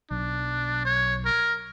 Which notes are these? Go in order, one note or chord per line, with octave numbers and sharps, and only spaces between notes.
B1 D4
C#5
A#4